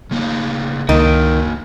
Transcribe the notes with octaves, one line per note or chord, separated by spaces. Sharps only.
C#3 A#3 D#4
C#2 D#3 A#3 F#4